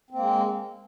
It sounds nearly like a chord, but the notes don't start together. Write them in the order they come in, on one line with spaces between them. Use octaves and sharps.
C4 A#3 G#3